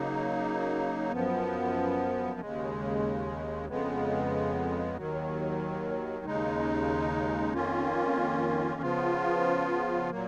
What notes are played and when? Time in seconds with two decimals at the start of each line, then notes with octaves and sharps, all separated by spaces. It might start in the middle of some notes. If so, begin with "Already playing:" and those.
Already playing: C#3 F#3 A#3 D#4
1.12 F#2 F3 B3
2.40 D#2 C#3 G#3
3.68 F2 C#3 G#3 B3
4.96 D#2 D#3 F#3
6.26 D#2 C#3 G#3 D#4
7.54 F2 D#3 A#3 C#4 F4
8.81 C#3 F3 B3 F4
10.10 A#2 F#3 A#3